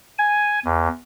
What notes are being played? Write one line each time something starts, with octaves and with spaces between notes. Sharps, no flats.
G#5
E2